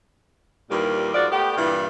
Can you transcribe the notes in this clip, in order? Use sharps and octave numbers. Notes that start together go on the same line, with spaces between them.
D#2 A#2 E3 G3 A#3
G#2 F3 F#4 D5
A3 B3 G4
G2 A#2 E3